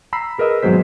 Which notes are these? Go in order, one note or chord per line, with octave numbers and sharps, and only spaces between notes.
A#5 B5 E6 B6 C7
G#4 A#4 B4 D#5 E6
G#1 B2 F#3 G#3 C5 B6